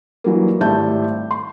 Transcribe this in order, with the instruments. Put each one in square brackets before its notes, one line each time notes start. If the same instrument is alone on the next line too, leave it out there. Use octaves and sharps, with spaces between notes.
[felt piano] E3 F#3 G3 A#3
G#1 A2 G3 E5 A5 G6
C6